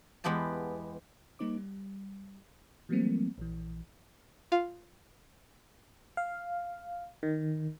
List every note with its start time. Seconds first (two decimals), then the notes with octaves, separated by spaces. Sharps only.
0.24 E2 G#3 B3 G4 A5
1.39 G3 A#3 D#4 C5 D6
1.57 G3
2.89 E3 F#3 G3 A3 A#3 C4
3.38 A#1 E3
4.52 F4 F5
6.17 F5
7.23 D#3